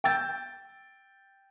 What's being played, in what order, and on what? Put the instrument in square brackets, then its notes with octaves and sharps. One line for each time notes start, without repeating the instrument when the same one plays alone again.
[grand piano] G5 E6 G6 A6